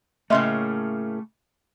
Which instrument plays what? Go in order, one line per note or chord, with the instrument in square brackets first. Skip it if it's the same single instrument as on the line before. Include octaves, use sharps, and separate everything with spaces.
[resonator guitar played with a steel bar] A2 C#3 A#3 [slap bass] A3 [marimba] D#5 E5 C6